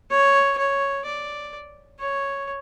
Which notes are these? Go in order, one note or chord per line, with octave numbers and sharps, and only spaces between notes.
C#5
C#5
D5
C#5